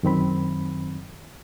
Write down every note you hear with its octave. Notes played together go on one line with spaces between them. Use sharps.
F#2 D#3 C4 B5